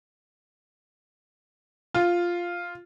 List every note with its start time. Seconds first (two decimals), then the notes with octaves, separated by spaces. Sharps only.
1.94 F4